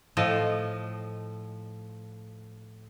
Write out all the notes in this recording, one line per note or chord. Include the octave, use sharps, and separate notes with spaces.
A2 F3 D#5